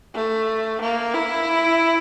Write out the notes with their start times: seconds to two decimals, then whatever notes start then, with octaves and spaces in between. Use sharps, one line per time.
0.15 A3
0.81 A#3
1.14 E4